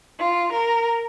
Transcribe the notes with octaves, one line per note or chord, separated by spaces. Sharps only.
F4
A#4